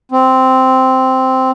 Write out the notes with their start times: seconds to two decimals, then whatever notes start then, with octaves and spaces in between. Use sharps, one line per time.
0.12 C4